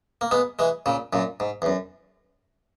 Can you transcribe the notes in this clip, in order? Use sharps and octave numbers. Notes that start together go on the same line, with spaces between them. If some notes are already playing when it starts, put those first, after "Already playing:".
A#3
G#3 B3
E3 G#3
A#2 C#3
F#2 A#2
G#2
E2
F#2